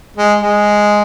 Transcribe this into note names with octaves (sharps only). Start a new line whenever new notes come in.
G#3
G#3